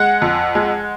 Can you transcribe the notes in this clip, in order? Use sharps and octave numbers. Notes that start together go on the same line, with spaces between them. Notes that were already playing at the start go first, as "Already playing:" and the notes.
Already playing: G#3 F#5
F2
G#3